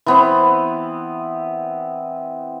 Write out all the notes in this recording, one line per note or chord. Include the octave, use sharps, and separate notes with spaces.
E3 B3 C4